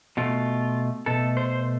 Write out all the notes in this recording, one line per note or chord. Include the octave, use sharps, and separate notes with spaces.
B2 A3 F4
B2 A3 A4
C5